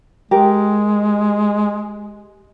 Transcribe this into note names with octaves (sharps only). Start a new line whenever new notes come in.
G#3 G4 A#4